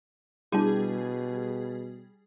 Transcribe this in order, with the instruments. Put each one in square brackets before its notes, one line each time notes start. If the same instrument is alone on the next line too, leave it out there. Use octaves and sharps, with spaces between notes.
[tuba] B2 [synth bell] G3 G#4 [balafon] D4 E4